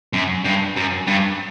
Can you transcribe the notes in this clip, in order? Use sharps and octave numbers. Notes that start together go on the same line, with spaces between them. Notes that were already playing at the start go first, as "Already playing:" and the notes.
F#2
G2
F#2
G2